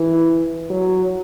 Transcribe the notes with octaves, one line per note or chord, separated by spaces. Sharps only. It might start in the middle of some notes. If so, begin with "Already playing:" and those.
Already playing: E3
F#3